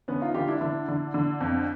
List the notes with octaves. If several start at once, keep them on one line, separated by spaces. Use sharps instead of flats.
D3 B3 C#4
D#4 F4
D3 F4 G4
D4 E4
D3 D4 E4
D3
D3
F2